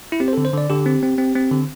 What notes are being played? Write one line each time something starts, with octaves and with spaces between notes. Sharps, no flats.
E4
C4 G4
C5
D3 A4
C5
D3 D5
D3 G4
C4
C4
C4
C4
D3